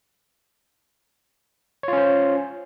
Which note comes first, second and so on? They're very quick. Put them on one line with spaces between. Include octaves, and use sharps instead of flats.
C#5 F4 C#4 C5